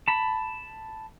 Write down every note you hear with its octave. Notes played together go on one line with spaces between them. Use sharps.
A5 B5